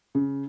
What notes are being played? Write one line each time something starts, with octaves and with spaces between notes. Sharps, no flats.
C#3